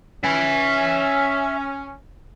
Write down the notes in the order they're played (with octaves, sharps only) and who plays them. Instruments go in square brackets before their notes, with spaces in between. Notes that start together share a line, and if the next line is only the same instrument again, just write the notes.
[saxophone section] C#4 [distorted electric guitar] E5 G#5